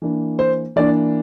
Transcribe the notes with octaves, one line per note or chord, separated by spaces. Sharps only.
E3 A#3 D4
C5
E3 A#3 D4 D5